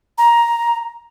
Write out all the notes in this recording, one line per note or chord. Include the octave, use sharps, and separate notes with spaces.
A#5